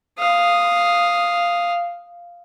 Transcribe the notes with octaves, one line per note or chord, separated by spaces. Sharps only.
F5 D#6